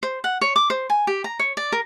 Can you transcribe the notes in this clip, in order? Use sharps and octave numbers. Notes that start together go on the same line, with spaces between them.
C5
F#5
C#5
D6
C5
G#5
G4
A#5
C#5
D5
A#4